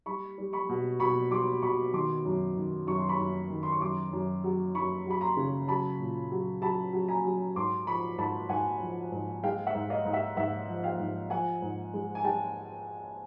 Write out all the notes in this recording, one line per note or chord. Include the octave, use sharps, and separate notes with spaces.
G3 B5 C#6
G3
B5 C#6
B2
B2 B5 C#6
G3 C6 D6
B2 B5 C#6
D#3 C6 D6
F#2
D#3
F#2 C#6
C6
B5 C#6
F#2
D#3
C6
C#6
F#2 C6 D6
F#2
F#3
F#2 B5 C#6
F#3 B5
A#5 C6
C#3
F#3 A5 B5
A#2
F#3
F#3 A5 B5
F#3
G#5 A#5
F#3
G#2 C6 D6
F3 B5 C#6
G#2 A5 B5
G#2 F#5 G#5
F3
G#2
G#3 F5 G5
E5 F#5
G#2
D#5 F5
G#2
E5 F#5
G#2 E5 F#5
F3
F5 G5
G#2
F3 F#5 G#5
G#2
G#3
G#5
G#3 G5 A5